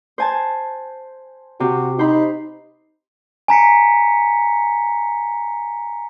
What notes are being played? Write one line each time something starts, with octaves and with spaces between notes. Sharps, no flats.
C5 G#5 A5
C3 F#4
D#4 C5 B5
G#5 A#5 B6 C#7